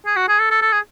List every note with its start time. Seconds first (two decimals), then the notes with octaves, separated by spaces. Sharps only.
0.06 G#4
0.16 F#4
0.28 G#4
0.39 A4
0.51 A4
0.62 A4
0.72 G#4